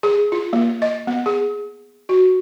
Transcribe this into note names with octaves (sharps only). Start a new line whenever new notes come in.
G#4
F4
A#3
D#5
B3
G#4
F#4